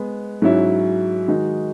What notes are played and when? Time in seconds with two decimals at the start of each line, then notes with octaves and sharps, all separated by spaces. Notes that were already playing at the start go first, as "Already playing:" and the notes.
Already playing: G#3 B3
0.42 G#2 F#3 C#4 E4
1.28 D#3 G#3 D#4 F#4